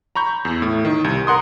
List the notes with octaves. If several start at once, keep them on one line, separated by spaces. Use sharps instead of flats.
A#5 B5 C#6 G6
E2
A2
D#3
C2
A#4 F#5 C6 D#6